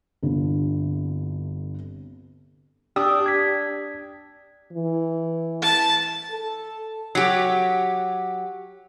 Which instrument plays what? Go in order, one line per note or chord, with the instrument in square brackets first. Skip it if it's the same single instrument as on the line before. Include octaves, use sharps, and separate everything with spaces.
[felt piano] G1 C2 D3
[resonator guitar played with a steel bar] D4 [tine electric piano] G4 D#6 E6
[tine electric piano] G#6 B6
[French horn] E3
[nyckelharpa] A5
[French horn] A4
[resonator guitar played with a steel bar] F#3 G4